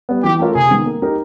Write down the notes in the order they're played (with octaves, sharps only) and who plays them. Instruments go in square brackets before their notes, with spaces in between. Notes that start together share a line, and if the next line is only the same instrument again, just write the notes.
[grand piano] G3 B3
[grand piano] E3 [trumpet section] G4
[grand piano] A3 C#4 F4 A#4
[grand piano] C3 [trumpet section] G#4
[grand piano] D#3 G#3 B3
A#3
D#4 G4 A#4